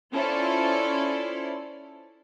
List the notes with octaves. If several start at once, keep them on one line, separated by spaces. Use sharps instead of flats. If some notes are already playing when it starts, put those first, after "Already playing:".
C#4 E4 F4 A4 C5 D5